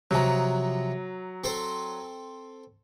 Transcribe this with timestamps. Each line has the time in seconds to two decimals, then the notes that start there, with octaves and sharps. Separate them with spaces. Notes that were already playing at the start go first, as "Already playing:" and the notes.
0.11 C3 F3 F#3 A#5
1.44 C4 A4 C5